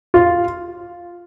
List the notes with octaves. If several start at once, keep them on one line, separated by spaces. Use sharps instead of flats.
F4